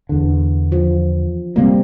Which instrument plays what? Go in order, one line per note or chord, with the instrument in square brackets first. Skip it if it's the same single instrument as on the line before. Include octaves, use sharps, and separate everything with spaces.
[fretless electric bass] E2 D3
[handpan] F3
[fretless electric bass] C3 A#3 [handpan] G3 C4